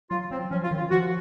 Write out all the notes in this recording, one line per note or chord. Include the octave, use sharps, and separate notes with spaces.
F#3 F4
F#3 C4
F3 C#4
F4
D#3
F4
F3 F#4